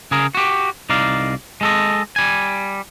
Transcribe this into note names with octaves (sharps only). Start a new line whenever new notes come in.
C#3 G#4 A#4
F#4 G4
C2 D#4 D5 F5
G#3 A4 D#5
G3 G#5